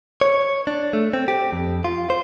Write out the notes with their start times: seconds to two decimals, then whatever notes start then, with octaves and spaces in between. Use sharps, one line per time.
0.21 C#5
0.67 D4
0.93 A3
1.13 C4
1.28 G4
1.52 F2
1.84 F4
2.10 C5